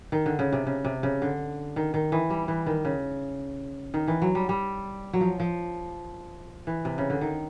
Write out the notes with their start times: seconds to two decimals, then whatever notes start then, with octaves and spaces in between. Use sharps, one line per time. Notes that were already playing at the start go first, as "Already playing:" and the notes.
0.12 D#3
0.26 D3
0.39 C#3
0.53 C3
0.67 C#3
0.85 C3
1.03 C#3
1.22 D3
1.76 D#3
1.94 D#3
2.12 E3
2.30 G3
2.48 E3
2.66 D#3
2.85 C#3
3.94 D#3
4.08 E3
4.22 F#3
4.35 G3
4.49 G3
5.13 F#3
5.21 F3
5.40 F3
6.67 E3
6.85 C3
6.98 C#3
7.10 D3
7.21 D#3